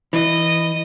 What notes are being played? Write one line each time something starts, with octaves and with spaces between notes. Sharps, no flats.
E3 D#5